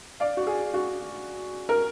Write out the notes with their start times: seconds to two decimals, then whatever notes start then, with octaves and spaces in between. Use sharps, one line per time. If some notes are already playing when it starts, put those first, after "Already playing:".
0.20 D5 F5
0.37 F#4
0.47 G#4
0.74 F#4
1.69 A#4